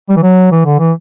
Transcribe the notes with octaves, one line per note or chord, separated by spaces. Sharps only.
G3
E3
F#3
E3
D3
E3